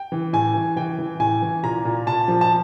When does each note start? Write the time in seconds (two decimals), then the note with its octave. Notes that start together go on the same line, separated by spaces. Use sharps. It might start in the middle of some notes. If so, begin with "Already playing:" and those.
Already playing: G5
0.12 E3
0.33 A2 G#5
0.55 E3
0.76 E3 G5
0.98 E3
1.20 A2 G#5
1.42 E3
1.64 A#2 A#5
1.85 A#2
2.07 A#2 A5
2.28 F3
2.41 A5